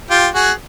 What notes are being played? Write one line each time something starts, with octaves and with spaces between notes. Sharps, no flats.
F4 G4
F#4 G#4